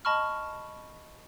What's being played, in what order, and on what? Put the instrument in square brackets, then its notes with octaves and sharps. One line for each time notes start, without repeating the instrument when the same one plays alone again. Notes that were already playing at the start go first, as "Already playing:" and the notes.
[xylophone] D#5 A5 B5 C#6 F6